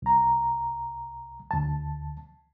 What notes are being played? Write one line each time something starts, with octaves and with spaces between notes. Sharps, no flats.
C2 A#5
D2 A5